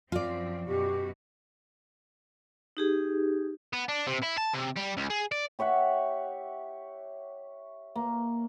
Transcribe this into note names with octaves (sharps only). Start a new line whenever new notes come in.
F#2 F3 C4 F4 D5
F#2 B2 F#4 G4
D#4 G4 G#4
B3
D4
C3
E4
A5
C3
G3
C#2
G#4
D5
G4 C#5 E5 F#5
A#3